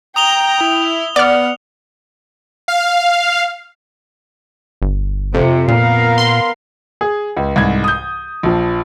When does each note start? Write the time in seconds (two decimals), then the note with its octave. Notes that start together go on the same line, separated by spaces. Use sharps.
0.16 G5 A#5 D#6 F7 G7
0.61 E4
1.16 B3 D5 F#5 F6
2.68 F5
4.82 G1
5.34 F2 C3
5.68 A#2 B3 A#4 F5
6.18 C6
7.01 G#4
7.37 C#2
7.56 C2 G#2 G#6
7.84 D#6 G6
8.43 A#1 F3